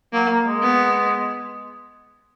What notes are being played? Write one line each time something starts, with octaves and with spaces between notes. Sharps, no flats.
F#3 A#3
A#3
G#3
B3